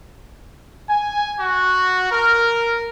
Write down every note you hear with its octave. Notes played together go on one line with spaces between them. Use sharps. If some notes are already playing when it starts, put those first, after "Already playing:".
G#5
F#4
A#4